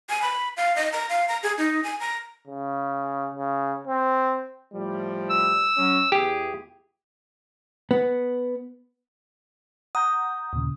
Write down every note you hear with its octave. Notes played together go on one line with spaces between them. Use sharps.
G#5
B5
F5
D#5
A#5
F5
A#5
G#4
D#4
G#5
A#5
C#3
C#3
C4
A2 F3 G3
E6
F#3 C#4
E2 G4 G#4
B3
F#5 A#5 D#6 G6
D#2 A#2 C#3